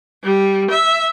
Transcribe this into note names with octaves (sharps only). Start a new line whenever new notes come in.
G3
E5